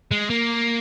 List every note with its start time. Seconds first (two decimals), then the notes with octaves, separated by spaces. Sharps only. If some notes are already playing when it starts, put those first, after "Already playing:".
0.11 G#3
0.30 A#3